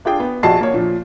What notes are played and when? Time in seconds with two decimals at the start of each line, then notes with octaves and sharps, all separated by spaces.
0.05 D4 F4 G#4 G5
0.20 B3
0.43 A#1 F#4 D#5 A5 C7
0.61 A#3 C#5
0.74 A#2 F3